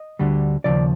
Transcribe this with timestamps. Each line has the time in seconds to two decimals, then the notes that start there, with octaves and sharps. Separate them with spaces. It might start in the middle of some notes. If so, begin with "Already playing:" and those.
Already playing: D#5
0.19 D2 D3 G3
0.64 D#2 C#3 F3 D5